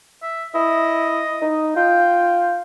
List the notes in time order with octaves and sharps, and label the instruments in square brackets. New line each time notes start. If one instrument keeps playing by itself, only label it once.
[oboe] E5
[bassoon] E4 [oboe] D#5
[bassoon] D#4
[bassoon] F4 [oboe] G5